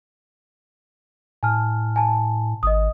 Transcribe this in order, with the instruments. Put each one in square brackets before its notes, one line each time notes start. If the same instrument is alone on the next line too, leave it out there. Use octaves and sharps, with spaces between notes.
[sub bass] A2 [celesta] G#5 A5 F6
[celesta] G#5 A5
[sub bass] G#1 [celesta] D#5 D#6